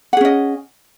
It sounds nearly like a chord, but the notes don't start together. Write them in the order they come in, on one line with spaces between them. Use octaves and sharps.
F#5 G#4 C#4 D#5